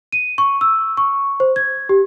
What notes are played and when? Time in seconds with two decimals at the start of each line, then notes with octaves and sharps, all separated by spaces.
0.12 D#7
0.38 C#6
0.61 E6
0.97 C#6
1.40 C5
1.56 G#6
1.89 G4